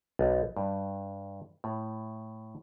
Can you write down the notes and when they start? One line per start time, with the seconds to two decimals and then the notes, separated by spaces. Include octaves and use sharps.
0.19 B1
0.57 G2
1.64 A2